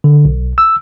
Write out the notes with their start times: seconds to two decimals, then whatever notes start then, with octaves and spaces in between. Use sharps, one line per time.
0.04 D3
0.25 B1
0.58 E6